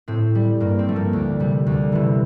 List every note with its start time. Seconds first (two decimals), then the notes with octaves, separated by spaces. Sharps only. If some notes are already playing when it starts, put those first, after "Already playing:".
0.08 A2 C4
0.35 G3
0.60 G2 A#3
0.79 C4
0.87 F3 A3
0.96 A#3
1.13 D2
1.40 C3 G3
1.67 D2
1.92 C3 E3